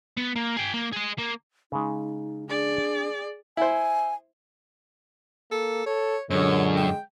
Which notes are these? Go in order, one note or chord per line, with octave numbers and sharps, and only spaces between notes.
B3
A#3
G#4 G5
A#3
G#4 D#5
A#3
C#3 G#3 D#4
D4 G#4 D5
E4 C5 G#5
A#3 A4
A4 C#5
F#2 A#2 D3 G#3 C#5
G5